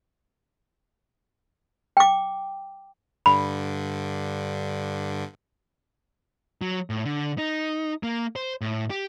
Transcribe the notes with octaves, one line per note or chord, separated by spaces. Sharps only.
G5 D6
G2 D3 B5
F#3
A2
D3
D#4
A#3
C5
A2
G4